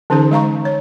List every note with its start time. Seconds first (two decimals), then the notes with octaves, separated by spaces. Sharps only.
0.10 D3 E3 C#4 D#4 G#4 C5
0.31 G#3 F5 A#5 C#6
0.65 C#5